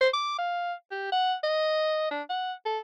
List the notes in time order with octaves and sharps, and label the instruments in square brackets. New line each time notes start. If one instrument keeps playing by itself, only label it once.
[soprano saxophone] C5
D6
F5
G4
F#5
D#5
D4
F#5
A4